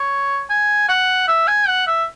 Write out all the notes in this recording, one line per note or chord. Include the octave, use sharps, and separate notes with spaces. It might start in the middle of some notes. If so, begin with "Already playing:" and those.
Already playing: C#5
G#5
F#5
E5
G#5
F#5
E5